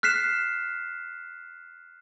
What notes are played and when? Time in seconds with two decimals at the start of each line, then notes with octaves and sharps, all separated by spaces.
0.03 F6 F#6 B6 C7 E7